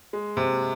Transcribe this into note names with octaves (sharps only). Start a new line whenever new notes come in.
G#3
C3